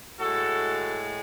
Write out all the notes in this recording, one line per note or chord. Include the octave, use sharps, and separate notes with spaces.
A2 G#3 F#4 A4